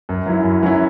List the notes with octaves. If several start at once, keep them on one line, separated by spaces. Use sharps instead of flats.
F#2
F#3 C#4 E4
F#2
F#3 C#4 E4